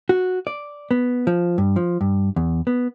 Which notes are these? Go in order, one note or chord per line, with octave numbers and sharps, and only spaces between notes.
F#4
D5
B3
F3
G2
F3
G2
E2
B3